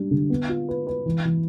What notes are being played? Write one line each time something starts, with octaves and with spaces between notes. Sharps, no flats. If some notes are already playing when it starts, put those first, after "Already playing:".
Already playing: G3 D4
D3
B3
F4
B4
B4
E3
E3